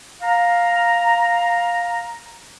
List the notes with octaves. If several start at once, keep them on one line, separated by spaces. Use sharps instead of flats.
F5 A#5